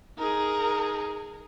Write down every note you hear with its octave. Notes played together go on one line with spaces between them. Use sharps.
D#4 G#4 A#4